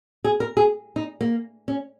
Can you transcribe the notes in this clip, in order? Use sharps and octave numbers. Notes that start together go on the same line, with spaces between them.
G#4
A#4
G#4
D#4
A#3
C#4